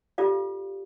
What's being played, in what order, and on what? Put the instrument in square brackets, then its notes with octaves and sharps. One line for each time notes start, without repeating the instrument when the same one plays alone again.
[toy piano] F4 G4 A4 D5 F5